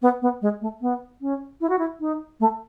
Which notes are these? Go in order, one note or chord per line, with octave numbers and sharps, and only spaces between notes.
B3
B3
G#3
A3
B3
C#4
E4
F#4
E4
D#4
A3